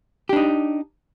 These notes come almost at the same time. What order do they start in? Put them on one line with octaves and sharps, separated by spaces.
G4 D4 D#4